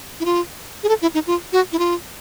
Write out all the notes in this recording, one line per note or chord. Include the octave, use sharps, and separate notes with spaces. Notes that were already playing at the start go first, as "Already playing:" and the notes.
E4
F4
G#4
A4
E4
D#4
F4
F#4
E4
F4